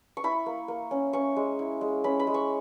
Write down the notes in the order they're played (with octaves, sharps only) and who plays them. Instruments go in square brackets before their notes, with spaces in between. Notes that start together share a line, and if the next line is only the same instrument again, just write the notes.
[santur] C#6
E4 B5
A#3
A#3
C#4
C#4 C#6
G#3
E4
G#3
C#4 B5
B5
G#3
C#6